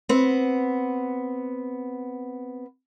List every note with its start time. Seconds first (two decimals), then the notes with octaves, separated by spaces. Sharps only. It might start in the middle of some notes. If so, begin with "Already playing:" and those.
0.09 B3 C4